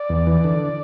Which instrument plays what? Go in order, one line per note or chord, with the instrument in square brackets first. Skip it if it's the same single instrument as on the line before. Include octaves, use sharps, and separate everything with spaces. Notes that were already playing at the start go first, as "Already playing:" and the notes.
Already playing: [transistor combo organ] D5
E2
E3
D3